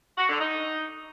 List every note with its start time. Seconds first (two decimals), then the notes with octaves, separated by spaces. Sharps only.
0.18 F#4
0.29 D3
0.41 D#4